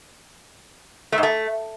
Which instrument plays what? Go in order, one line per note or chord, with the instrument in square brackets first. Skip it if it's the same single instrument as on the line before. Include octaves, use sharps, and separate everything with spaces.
[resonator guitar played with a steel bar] A3
G#2
A3